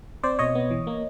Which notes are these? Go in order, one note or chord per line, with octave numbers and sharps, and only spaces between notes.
C4 C5 D5
B2 C#5 D#5
B3
E3
A#3